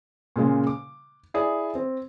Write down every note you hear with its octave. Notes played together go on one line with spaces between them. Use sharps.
A#2 C#3 G#3 F5
D6
E4 G#4 D5
C4